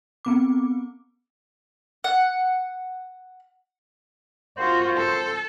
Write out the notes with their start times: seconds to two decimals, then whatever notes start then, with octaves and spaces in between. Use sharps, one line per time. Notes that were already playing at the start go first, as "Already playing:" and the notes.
0.25 B3 C4 D6
2.04 F#5
4.58 A#3 C4 F4 F#4 C5
4.97 A4